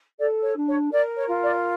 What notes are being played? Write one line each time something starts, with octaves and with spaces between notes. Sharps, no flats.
A4 D5
C#5
D4
C#5
A#4 D5
C#5
F4
D5